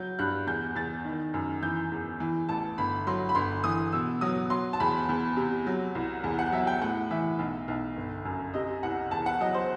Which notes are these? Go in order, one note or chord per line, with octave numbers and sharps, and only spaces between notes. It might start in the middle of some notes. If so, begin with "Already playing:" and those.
Already playing: F#3 G6
G2 F#6
E2 G6
E2 A6
D#3
F#2
E3 G6
E2
E3
A1 A5
G1 B5
F#3 C6
B5
G1 C6
E3 D#6
B2 E6
F#3 D#6
F#3 C6
A5
E2 B5
E2
C3
F#3
C2
E2
F#5
F#3 E5
G5
A2 F#5
E3 E5
B1
B1
G1
F#2
C3 D#5
C2 F#5
E2 A5
F#5
F#3 D#5
C5